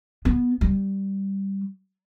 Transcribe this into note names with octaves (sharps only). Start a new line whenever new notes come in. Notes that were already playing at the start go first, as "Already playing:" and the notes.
B3
G3